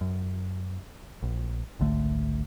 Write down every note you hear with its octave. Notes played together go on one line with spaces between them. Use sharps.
F#2
A#1
G#1 C#2 D3 A3